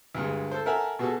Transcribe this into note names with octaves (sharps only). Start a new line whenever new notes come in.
D2 G2 G#3
A4 C5
A4 A#4 E5 F#5 G#5
B2 F#4 G#4 A4